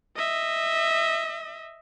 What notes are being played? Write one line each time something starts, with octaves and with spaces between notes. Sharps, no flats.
D#5 E5